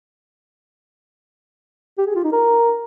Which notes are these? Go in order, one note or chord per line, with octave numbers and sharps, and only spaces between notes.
G4
G#4
F4
D#4
A#4